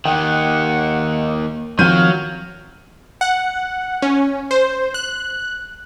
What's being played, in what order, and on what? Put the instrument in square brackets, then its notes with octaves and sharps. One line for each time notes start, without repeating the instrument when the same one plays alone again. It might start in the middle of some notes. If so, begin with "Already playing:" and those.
[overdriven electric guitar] D#2 D#3 [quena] F#5 [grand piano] G5
[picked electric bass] D#3 F3 C4 [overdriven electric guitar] F#3 [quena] F6 [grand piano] G6 D#7
[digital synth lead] F#5
C#4
C5
F#6